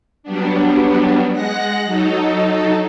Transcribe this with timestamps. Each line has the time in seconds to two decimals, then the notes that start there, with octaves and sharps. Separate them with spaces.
0.23 F#3 G3 B3 D4
1.32 G#3 F#5 F#6 A#6
1.85 F#3 D#4 A4